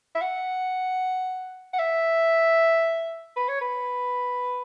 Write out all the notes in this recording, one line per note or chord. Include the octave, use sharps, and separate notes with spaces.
E5
F#5
F#5
E5
B4
C#5
B4